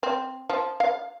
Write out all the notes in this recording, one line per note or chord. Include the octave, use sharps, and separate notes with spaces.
C4
F3
F5